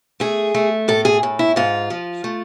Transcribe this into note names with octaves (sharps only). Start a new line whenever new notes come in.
A3 G#4
A3
A2 A4
G#4
A2
E4
G#2 F4
F3
A3